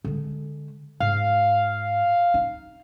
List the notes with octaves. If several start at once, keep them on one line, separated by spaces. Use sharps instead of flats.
D3 G#3
G#2 F5
D#4